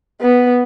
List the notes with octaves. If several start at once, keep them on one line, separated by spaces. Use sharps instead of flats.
B3